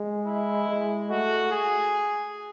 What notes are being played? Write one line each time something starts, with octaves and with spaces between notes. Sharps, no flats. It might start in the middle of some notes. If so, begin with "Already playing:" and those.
Already playing: G#3
E4
G#3
A3 F#4
G#4